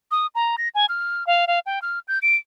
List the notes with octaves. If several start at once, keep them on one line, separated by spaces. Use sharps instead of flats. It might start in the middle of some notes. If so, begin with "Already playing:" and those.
D#6
A#5
A#6
G#5
F6
F5
F5
G5
F6
G6
D7